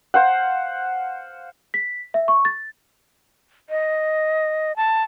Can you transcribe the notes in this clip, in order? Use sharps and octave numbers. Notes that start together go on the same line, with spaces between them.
C5 F5 F#5
B6
E5
C#6
A6
D#5
A5